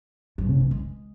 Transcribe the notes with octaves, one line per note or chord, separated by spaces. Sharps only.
F#2
C#3
E3
G#3